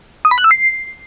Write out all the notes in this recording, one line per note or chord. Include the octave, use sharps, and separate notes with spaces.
D#6
B5
F#6
E6
C7